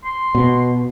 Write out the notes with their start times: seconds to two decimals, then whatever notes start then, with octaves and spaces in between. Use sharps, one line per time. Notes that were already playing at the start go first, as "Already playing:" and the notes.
0.04 C6
0.35 B2